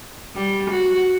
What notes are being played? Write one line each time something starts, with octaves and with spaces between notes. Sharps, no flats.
G3
F#4